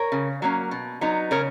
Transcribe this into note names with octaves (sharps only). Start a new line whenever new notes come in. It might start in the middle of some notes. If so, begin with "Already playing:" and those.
Already playing: A#4 C#5
C#3
F#3 A#3 C#4
B2
F#3 B3 D#4
C#3 A#4 C#5